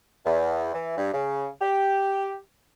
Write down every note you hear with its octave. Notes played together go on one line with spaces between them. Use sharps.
E2
E3
G2
C#3
G4